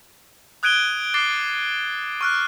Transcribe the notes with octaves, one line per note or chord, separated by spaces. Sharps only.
D#6 F#6 G#6 D7 D#7 G7
D6 F#6 A6 C7 G7
C#6 F6 F#6